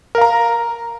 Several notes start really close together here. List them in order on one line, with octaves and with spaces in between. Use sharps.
A#4 F5 A#5